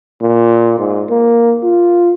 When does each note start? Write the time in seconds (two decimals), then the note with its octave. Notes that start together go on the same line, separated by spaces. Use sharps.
0.22 A#2
0.78 G#2
1.10 A#3
1.64 F4